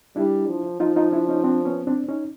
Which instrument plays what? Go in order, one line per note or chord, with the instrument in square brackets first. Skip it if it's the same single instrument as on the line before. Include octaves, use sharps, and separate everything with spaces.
[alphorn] G3 [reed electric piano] D4 E4
[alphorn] F3
[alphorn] F3 [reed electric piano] D#4 F4
[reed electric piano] D#4 F4
D4 E4
C#4 D#4
C4 D4
B3 C#4
C4 D4
C#4 D#4